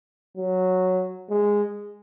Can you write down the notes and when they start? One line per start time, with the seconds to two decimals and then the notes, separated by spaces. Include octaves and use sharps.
0.37 F#3
1.30 G#3